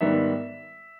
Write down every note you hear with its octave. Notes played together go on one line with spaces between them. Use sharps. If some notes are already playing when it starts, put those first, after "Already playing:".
G#2 D#3 G3 B3 E5